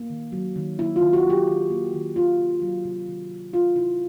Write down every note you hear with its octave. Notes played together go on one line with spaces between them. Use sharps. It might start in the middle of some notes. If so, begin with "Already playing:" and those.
Already playing: A#3
D#3
F#3
D#3
A#3 E4
F4
D#3
F#4
F#3
G4
D#3
A#3
D#3
D#3 F4
C3
F#3
C3
D#3
C3
F#3 F4
C3 E4